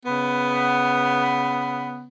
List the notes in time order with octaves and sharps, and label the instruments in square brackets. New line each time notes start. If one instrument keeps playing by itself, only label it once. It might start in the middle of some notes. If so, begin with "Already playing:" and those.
[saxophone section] C#3 B3